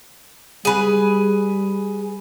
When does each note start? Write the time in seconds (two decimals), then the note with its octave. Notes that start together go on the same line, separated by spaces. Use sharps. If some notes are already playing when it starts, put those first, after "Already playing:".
0.65 G3 G#4 B4